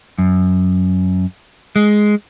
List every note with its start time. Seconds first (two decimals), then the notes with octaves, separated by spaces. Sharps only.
0.18 F#2
1.76 G#3